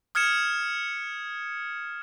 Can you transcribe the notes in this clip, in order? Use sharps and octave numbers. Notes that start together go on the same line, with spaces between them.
D#6 F6 G#6 C#7 E7